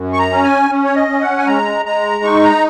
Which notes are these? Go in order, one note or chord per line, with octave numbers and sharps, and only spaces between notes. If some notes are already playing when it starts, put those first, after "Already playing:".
Already playing: F#2
C#6
A#5
C#4
G#5
C#4
C#5
D#5
C#4
F#5
G#5
G#3 A#5
G#3 A#5
D#4 C#6
A#5